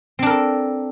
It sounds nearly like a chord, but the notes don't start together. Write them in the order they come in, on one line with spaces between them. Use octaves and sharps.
C4 D4 A#4 A4